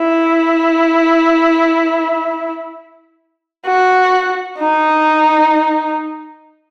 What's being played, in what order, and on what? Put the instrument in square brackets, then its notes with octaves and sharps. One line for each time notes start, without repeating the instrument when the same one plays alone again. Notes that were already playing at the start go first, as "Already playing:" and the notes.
Already playing: [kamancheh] E4
F#4
D#4